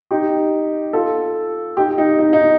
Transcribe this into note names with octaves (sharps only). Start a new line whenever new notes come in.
D#4 G4
F4 A4
D#4 G4
D#4
D#4
D#4